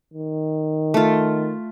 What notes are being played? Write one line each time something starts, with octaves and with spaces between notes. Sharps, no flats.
D#3
A3 F4